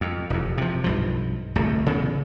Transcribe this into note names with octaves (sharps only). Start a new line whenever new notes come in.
F2
E1 F2
C3 F3
B1 G2 F3
D1 C2 A3
C#3 E3 B3